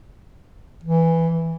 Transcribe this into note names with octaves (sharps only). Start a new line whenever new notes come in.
E3